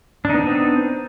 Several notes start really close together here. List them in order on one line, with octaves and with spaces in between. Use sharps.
D4 D#4 B3 C4